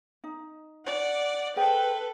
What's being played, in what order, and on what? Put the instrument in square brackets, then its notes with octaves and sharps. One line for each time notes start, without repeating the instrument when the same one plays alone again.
[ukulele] D#4
[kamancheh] D5 F#5
[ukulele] G#4 C5 G5 [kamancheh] A4 B4